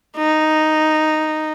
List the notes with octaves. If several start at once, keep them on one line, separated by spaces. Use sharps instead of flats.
D#4